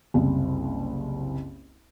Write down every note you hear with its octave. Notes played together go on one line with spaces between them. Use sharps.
F#1 C2